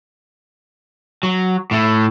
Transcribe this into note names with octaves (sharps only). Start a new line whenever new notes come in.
F#3
A2 A3